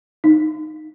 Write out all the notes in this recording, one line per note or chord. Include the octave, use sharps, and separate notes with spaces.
D#4